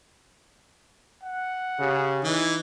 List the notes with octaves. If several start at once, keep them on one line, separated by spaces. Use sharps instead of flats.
F#5
C#3 G4
E3 D#4